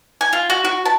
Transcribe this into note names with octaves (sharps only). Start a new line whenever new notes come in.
G#5
F4
F#4
F#4
A5